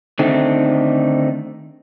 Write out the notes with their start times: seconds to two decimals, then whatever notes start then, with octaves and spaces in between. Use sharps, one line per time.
0.19 D3 D#3 A3 C4 D#4